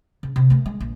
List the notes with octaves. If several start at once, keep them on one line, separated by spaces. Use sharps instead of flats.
C#3
C3
A3 A#3
G#3
A#1